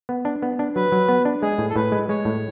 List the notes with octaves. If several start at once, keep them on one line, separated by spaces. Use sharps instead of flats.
B3
D4
B3
D4
F#3 B4
F#3
B3
D4
G#3 G#4
A2
A4
A2 B4
G#3
G#3 C#5
A2